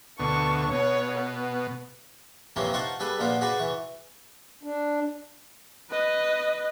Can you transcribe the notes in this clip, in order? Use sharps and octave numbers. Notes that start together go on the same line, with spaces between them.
D2 B2 A5 C#6
B2 C#5
B3
C3 E3 F3 A#3 C4 C#4
D#4 F4 C5 F#5 A5 C#6
G3 G#4 A4 B4
A#1 A#2 F3 B3 F4 C5
F#4 G#4 B4 C5 D5
E3 C#6
D4
B4 D#5